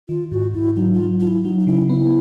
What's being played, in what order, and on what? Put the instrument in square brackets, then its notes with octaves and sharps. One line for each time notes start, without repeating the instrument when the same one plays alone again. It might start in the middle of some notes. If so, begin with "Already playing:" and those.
[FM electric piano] D#3 [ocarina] F4
[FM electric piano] G#2 [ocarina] F#4
[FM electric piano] G#2 [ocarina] E4
[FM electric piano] F#3 [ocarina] D#4
[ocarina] F4
[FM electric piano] F#3
[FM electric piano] F#3 [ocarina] F4
[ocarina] E4
[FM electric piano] F#3 [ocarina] D#4
[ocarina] D#4
[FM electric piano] C#3 [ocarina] E4
[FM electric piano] B3 [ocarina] E4